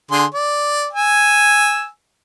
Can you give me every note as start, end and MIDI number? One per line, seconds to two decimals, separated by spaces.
0.11 0.25 50
0.11 0.25 68
0.11 0.25 84
0.34 0.87 74
0.93 1.87 80
0.93 1.87 88